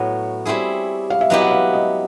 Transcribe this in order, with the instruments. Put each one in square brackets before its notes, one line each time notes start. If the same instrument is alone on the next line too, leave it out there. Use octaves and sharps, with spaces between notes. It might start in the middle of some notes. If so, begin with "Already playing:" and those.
Already playing: [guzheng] A2 F#3 B3 [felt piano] C#5
[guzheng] G3 C4 E4 G#4
[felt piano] F5
E5
[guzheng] F#3 B3 E4 G4 [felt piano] D#5
[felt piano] F#5
F5
D#5